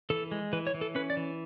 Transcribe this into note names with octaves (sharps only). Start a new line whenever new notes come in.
E3 A4
G#3
E3 B4
C#5
E3
A4
C#4 B4
D5
E3